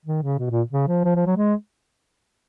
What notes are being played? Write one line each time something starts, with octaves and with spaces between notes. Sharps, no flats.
D#3
C#3
B2
A#2
C#3
F3
F3
F3
F#3
G#3